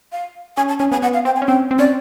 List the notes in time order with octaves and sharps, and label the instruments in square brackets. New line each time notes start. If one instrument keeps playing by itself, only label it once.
[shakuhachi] F5
[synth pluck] C#4 [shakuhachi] G#5
[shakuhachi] A5
[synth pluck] C#4 [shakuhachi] G#5
[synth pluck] B3 [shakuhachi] G#5
[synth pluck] B3 [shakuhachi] F#5
[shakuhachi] F5
[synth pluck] C4 [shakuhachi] G5
[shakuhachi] G#5
[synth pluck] C#4
[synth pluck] C4 [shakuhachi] G5
[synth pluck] C4
[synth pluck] C#4 [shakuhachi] D5